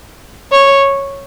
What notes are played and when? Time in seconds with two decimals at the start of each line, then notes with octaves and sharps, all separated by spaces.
0.52 C#5